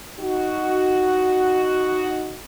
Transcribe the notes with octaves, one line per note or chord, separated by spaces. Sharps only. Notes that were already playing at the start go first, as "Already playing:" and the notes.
D#4 F#4